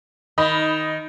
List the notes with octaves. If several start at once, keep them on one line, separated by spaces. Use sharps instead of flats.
D#3 D#5 B5